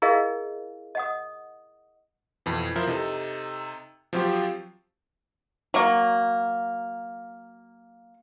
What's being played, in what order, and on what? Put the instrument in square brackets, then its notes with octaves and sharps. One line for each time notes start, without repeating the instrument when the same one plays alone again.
[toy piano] E4 G#4 A#4 D#5 F5
D#5 F#5 D#6
[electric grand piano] F2 B2 E3
F3 E4 A#4 C5
C3 D#4 A4
F3 F#3 C4 F4 G4
[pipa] F#3 A#3